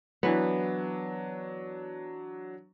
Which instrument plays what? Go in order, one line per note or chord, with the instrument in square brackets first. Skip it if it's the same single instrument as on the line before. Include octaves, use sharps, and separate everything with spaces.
[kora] E3 B3 [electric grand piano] F#3 D4